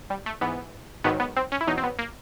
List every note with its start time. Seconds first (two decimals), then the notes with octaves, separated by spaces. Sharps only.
0.10 G3
0.26 A3
0.41 G#2 E3 B3
1.04 G#2 D#3 F#3 B3
1.20 B3
1.36 C4
1.52 C#4
1.61 E4
1.67 E2 B2 F#3 D#4
1.78 C4
1.83 B3
1.99 A#3